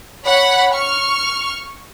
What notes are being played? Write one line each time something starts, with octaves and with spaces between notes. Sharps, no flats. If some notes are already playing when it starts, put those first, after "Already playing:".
C#5 F#5 B5
C#6 F6